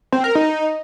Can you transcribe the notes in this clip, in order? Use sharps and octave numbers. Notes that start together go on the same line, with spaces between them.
C4
A#4
D#4